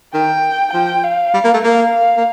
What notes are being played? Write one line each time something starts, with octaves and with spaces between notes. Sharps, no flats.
D#3 G5
F3 G5
F5
G3
A#3
A3
A#3 F5
F5
A#3